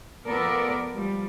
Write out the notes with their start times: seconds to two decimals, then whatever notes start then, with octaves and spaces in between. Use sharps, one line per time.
0.24 F3 B3 A4 A#4 D5
0.91 F3 G3